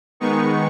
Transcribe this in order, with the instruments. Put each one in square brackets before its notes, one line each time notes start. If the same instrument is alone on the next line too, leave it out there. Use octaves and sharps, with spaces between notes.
[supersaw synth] D#3 G#3 B3 D#4 C#6